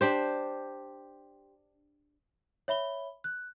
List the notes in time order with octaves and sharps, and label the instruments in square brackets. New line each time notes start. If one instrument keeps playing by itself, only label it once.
[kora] D4 G4 C5
[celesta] C#5 E5 B5 G7
F#6